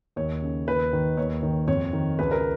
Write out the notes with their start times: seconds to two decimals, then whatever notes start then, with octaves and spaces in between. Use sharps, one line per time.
0.16 D#2 C#5
0.42 C#3
0.67 D#2 B4
0.93 D#3
1.17 D#2 C#5
1.43 D#3
1.68 F2 C#5
1.93 D#3
2.19 C#2 B4
2.31 A#4